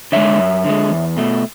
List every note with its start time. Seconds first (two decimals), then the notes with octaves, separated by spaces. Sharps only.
0.12 D3 G#3 C#5 E5
0.38 F#2
0.64 D3 G#3
0.91 E2
1.17 B2 A3